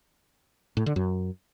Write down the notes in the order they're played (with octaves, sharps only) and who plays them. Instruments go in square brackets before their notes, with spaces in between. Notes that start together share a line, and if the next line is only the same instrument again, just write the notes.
[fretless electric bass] A2
D3
F#2